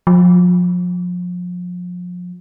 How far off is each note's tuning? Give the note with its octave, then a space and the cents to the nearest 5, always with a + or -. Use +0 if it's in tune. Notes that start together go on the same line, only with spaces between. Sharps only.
F3 +35